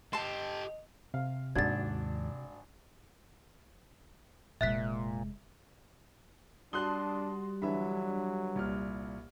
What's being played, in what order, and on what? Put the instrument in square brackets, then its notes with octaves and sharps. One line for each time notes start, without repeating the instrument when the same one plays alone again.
[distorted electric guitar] G4 A4 [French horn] D#5 [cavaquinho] A5 C6
[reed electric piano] C3 [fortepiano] F5
[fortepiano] G#1 D4 F#4 [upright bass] D#2 G#2 [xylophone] G#6 A6
[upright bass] F1 G#3 [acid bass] A#2 [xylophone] E5 F#6 B6
[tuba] G3 [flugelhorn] D4 [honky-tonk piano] F#4 C6 D#6 [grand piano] A5 F#6 G7
[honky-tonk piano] D3 E3 D4 [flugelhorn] F#3 [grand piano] E5 B5
[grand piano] C2 A#2 F6